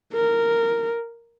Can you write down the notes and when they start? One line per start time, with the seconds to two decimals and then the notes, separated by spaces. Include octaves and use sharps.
0.13 A#4